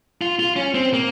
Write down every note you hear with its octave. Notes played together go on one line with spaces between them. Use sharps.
F4
F4
C#4
C4
A#3